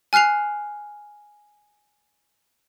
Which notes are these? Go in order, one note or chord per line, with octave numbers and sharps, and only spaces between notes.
G#5 F6 F#6 C7 F7